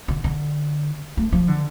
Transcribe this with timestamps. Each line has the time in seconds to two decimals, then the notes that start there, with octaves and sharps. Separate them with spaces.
0.08 D3
0.24 D3
1.17 A3
1.32 F3
1.48 D3